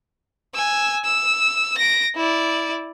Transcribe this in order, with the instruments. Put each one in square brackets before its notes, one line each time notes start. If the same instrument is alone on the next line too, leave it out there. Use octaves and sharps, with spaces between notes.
[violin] G#5 E6
E6
A#6 D7
E4 D5